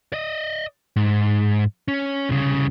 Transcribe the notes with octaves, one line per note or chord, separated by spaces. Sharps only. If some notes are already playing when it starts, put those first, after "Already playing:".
D5 D#5
G#2
C#4
C2 C#3